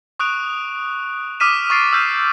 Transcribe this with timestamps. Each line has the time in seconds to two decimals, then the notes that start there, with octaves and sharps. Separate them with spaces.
0.19 C#6 D#6 F#6 D7 F7
1.40 D6 D#6 F6 B6 D#7 E7
1.70 C#6 D#6 A6 C7 D7
1.93 E6 F6 G6 B6 D#7 E7